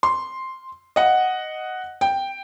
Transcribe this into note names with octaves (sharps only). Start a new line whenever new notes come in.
C6
D#5 F#5
G5